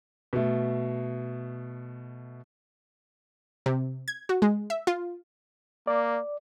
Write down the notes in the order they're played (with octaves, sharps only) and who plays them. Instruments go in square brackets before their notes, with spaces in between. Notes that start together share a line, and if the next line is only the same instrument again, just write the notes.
[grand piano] B2 A3
[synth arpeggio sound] C3
G#6
F#4
G#3
E5
F4
[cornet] A#3 [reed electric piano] D5